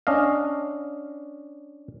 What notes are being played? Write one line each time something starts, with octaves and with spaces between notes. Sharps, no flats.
C#4 D4 D#5 F5